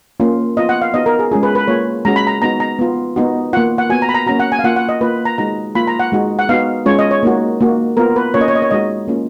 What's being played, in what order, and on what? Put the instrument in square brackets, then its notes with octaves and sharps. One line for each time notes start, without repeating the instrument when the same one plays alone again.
[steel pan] A#3 C#4 F4
B3 F4 D#5
F#5
F5
B3 D#4 F#4 D#5
A#4
G#4
G#3 C#4 F4 G#4
B4
B4
A#3 F4 C#5
G#3 C#4 F#4 A#5
B5
A#5
B3 D#4 F#4 A#5
A#5
B3 F4
B3 D#4 F#4
A#3 F4 F#5
F#5
B3 F#4 G#5
A#5
B5
A#5
A#3 C#4 F#4 A#5
F#5
G#5
F5
A#3 F4 F#5
F#5
D#5
A#3 F4 B4
A#5
G#3 D#4 F#4 A#5
A#3 F4 B5
A#5
F#5
G#3 D#4 F#4
F#5
B3 D#4 F#4 F5
G#3 C#4 F4 C#5
D#5
C#5
A#3 D#4 F#4
A#3 D#4 F#4
B3 F4 A#4
B4
A#3 C#4 F4 C#5
D#5
C#5
D#5
C#5
G#3 D#4 F#4 D#5
A#3 C#4 F4